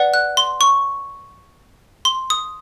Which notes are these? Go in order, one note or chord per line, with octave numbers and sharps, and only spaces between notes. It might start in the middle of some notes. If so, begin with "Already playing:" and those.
Already playing: B4 D5 F#5
F#6
C6
C#6
C6
D#6